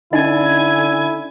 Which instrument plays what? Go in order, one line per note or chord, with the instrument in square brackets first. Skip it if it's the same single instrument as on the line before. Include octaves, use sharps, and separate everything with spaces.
[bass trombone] D3 [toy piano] C#4 D#4 D#5 [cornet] E4 [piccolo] G#5